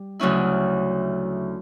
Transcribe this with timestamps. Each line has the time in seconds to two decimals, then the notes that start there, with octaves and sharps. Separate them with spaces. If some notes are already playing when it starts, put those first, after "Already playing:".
Already playing: G3
0.20 D2 C#3 F#3 C#4 E4